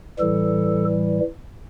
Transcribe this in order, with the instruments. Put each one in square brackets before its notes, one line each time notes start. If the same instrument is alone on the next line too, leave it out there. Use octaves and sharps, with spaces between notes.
[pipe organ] A2 E3 G3 A4